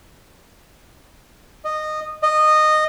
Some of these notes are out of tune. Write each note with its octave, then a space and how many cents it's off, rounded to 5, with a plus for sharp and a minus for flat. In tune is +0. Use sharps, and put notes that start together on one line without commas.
D#5 -15
D#5 -15